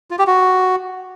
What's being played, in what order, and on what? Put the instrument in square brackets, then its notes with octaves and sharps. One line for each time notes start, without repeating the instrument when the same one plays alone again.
[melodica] F4
G4
F#4